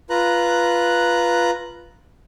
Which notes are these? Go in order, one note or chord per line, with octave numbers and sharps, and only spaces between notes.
F4 B4 A#5 F#6